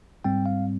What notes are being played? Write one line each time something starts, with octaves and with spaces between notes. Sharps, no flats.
G#2 G3 C4 G5
F5